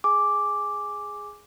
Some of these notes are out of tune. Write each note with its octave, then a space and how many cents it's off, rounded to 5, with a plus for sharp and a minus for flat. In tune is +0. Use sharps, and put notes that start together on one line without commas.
G#4 +0 G#5 +0 D6 +0